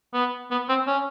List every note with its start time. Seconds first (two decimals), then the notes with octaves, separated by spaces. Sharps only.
0.14 B3
0.51 B3
0.69 C4
0.87 C#4